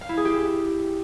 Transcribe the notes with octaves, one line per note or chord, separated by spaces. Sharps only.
F5
E4
G#4
G4